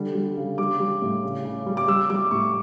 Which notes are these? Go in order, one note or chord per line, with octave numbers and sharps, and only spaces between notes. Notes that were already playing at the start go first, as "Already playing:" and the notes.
Already playing: D3 G3
G3
C#3
G3 D6
G3
A2
C#3
C#3
G3
D6
G3 E6
G3 D6
A2 C#6